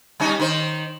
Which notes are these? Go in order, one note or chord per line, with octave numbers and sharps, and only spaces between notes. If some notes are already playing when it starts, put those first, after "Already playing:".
G3 C#4 D#4
D#3 C5